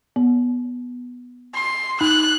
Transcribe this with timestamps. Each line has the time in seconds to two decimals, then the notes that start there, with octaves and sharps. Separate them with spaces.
0.16 B3
1.54 C6
2.01 D#4 F#6